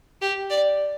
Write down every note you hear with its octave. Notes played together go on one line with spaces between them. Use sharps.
G4
D5